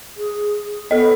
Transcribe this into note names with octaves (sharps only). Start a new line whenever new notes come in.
G#4
B3 A4 D#5